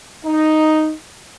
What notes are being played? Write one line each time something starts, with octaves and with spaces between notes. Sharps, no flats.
D#4